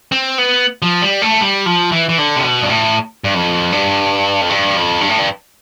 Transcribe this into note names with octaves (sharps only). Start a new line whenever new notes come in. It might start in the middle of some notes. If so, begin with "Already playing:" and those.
C4
B3
F3
G3
A3
G3
F3
E3
E3
D3
C3
B2
G2
A2
G2
F2
G2
F2
G2
F2
G2
A2
G2